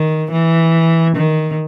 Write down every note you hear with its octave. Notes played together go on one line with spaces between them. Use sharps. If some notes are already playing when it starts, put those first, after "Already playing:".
Already playing: D#3
E3
D#3